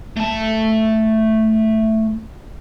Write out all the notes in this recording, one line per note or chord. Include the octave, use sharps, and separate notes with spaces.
A3 A5